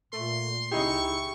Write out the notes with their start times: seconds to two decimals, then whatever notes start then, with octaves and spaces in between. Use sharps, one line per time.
0.13 A#2 A3 C6
0.71 C#2 D#4 E4 G4 G#4 C#6